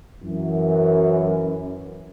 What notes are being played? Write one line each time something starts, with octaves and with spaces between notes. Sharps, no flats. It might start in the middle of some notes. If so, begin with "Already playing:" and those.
F#2 E3